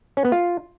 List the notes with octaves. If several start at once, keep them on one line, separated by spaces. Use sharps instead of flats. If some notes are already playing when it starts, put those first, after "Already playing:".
C#4
B3
F4